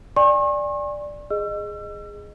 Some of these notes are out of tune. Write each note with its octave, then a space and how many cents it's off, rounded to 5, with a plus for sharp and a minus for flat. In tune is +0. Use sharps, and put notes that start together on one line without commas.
D5 +0 G#5 -35 C#6 -40
G#4 +0 D#5 -15 E6 +35